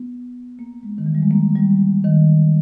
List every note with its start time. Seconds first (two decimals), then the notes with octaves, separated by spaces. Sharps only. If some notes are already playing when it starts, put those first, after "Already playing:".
Already playing: B3
0.59 A#3
0.83 G#3
0.98 D#3
1.06 E3
1.15 G3
1.22 G#3
1.31 A#3
1.56 G3
2.04 D#3